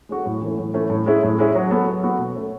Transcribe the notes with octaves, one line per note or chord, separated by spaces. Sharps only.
G#3 C#4 F#4 A4
A2
E3 A3 C#4
A2
E3 A3 C#4
A2
G#3 C#4 E4 G#4
A2
G#3 C#4 E4 G#4
F#3
B3 F#4 A4
F#3
B3 F#4 A4
B2
A3 C#4